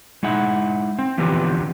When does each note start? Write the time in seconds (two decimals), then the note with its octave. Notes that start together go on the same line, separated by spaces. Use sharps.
0.23 G#3 D#4 E4 F#5
0.99 C4
1.18 D3 E3 F3 B3 C4 G4